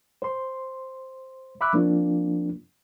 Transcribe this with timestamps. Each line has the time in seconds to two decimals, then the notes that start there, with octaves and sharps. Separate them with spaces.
0.22 C5 C6
1.61 E5 B5 C#6 D6 E6 F#6
1.73 F3 A#3 C4 D4 F4